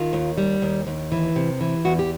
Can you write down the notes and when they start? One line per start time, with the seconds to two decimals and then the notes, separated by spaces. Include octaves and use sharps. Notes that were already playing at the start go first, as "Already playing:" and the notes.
Already playing: D#3 F4
0.13 D#2
0.38 G3
0.62 D#2
0.87 D#2
1.12 E3
1.36 C3
1.61 E3
1.85 E2 F#4
1.99 G4